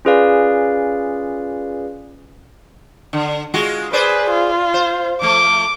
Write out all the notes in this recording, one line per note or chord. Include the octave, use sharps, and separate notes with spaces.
C#4 F4 G#4 B4 D5 F5
D3
G#3 F4 F#4
G#4 B4 C5 D5
F4
C5
F3 A3 D6